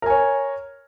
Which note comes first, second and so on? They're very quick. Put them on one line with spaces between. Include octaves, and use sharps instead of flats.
A#4 G#5 C#5